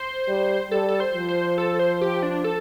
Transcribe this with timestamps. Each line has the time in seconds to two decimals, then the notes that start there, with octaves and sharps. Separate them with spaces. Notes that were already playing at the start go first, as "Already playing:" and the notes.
Already playing: C5
0.28 G3
0.71 G3 A4
0.88 A4
1.00 C5
1.14 F3
1.28 C5
1.58 A4
1.79 C5
2.01 G4
2.23 D4
2.44 A4